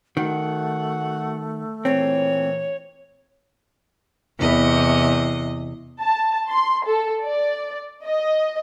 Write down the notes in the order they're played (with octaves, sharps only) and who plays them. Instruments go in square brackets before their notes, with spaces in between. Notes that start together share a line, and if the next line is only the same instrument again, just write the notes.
[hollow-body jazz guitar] D#3 [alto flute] A3 [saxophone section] F#4 F#5
[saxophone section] A#2 E3 [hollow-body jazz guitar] C4 [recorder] C#5
[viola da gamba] E2 C3 D#5
[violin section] A5
C6
A4
D5
D#5